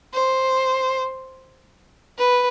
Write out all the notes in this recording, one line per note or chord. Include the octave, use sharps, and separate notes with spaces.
C5
B4